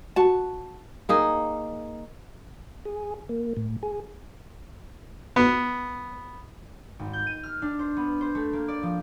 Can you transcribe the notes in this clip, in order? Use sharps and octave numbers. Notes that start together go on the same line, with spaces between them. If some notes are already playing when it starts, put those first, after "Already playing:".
F#4 A5
A#3 D#4 G#4
G#4
A#3
A2
G#4
B3
G#1
G6
D#7
F6
D4
C5
B3
C5
A3
A#3
D5
F3